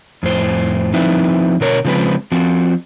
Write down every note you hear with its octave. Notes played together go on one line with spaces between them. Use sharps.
F2 A2 C5
F3 C4 D#4 E4 B4 E5
B2 D3 A#4 C#5
C#3 F3 G#3 C4 B4
F3 C4 F#4